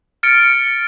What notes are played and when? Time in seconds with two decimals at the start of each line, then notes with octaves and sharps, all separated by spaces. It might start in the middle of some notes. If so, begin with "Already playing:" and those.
0.23 F6 A6 C#7 D7